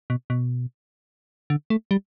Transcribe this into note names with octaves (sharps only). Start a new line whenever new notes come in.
B2
B2
D3
A3
G3